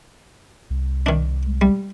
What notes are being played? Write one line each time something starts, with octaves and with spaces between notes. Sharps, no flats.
C2
D#3 D4
G3